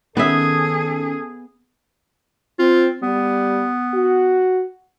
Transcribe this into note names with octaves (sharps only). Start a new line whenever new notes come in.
D#3 B3 C#4 G#4 A4 E5
C4 F4
G3 B3
F#4